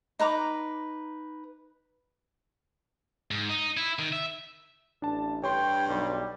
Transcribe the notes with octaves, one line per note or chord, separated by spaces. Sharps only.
D#4 B4 A#5 D6
G#2
D#4
E4
D#3
E5
A1 D4 A5
G2 C#5 G5 C6
B1 G3